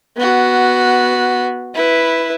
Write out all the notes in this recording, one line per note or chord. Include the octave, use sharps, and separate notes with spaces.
B3 F#4
E4 B4